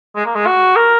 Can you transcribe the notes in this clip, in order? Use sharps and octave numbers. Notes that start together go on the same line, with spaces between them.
G#3
A#3
G#3
F#4
A#4